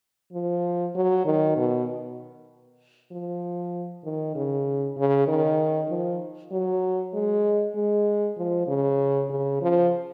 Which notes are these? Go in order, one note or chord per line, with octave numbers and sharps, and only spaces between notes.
F3
F#3
D#3
B2
F3
D#3
C#3
C#3
D#3
F3
F#3
G#3
G#3
F3
C#3
C#3
F3